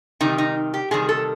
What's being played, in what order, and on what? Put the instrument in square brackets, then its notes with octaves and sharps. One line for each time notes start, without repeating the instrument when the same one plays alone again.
[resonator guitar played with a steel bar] C3 D#3 G3 D#4
D#4
G4
C3 D#3 G3 G#4
A4